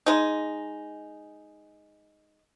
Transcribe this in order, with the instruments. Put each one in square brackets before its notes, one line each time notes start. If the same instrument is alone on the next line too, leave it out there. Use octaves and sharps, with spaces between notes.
[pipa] G#3 D#4